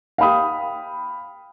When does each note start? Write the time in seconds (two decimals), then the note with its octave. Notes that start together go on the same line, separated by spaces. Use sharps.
0.18 F5 G5 B5 D#6